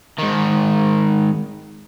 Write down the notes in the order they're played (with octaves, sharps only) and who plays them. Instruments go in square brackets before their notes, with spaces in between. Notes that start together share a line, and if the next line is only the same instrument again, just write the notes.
[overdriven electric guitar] G#2 D#3